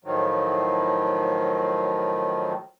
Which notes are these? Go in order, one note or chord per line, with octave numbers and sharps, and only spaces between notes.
A2 D#3 F3 F#3